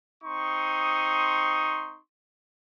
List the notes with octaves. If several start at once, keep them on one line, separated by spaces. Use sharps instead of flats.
C4 D#4 C6 C#6 D#6